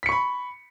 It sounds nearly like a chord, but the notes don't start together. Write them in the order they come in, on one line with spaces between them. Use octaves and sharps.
B6 C#7 C#6 B5